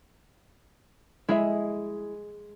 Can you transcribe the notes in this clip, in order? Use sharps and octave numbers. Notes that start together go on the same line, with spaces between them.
G#3 E4 G#4 E5